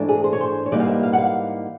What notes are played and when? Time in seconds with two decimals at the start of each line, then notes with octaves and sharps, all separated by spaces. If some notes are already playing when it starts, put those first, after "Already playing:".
Already playing: G#2 E3 A3 D4
0.09 G#4
0.24 C5
0.33 C#5
0.41 C5
0.66 C#5
0.72 G#2 E3 G3 A#3 D#4 D5
0.80 F5
0.87 E5
1.03 F5
1.13 F#5
1.18 F5